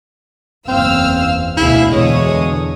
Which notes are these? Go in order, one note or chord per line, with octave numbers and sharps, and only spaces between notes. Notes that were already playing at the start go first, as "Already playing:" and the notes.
F#1 E2 C4 F5 E6 F6
D2 B2 E4 G#4 E5 F5
E2 B2 D3 G#3 C#5 D#6